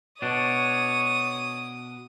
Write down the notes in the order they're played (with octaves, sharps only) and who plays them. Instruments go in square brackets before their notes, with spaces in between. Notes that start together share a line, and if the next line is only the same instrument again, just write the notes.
[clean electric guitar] B2 D4 [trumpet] C#5 [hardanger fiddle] D#6